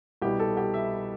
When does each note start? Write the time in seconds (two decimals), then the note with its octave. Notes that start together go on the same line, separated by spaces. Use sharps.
0.22 C2 B2 G3 G4
0.40 A4
0.57 G4
0.74 E5